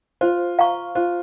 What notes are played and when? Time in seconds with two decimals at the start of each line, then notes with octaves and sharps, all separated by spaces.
0.21 F4 C5
0.59 F5 A#5 C#6
0.95 F4 C5